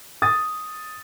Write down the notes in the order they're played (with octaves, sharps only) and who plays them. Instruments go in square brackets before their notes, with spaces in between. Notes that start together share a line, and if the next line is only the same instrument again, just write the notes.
[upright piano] D#6 A6